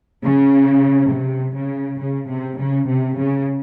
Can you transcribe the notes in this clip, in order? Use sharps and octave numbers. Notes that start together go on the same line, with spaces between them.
C#3
C3
C#3
C#3
C3
C#3
C3
C#3